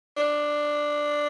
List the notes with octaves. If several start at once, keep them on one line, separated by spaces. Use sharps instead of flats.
D4